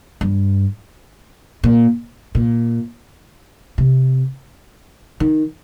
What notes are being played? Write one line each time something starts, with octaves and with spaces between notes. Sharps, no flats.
G2
A#2
A#2
C3
D#3